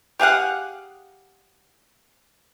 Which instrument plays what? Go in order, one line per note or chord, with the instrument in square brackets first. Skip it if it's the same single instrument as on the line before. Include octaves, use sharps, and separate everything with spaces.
[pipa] G4 G#4 F5 F#5